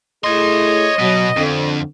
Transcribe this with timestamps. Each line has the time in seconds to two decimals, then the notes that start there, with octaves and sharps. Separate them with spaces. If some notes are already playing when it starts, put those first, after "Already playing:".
0.24 A3 E4 G#4 C#5 D#5 C6
0.99 B2 F#3 B3
1.37 F2 D3 C4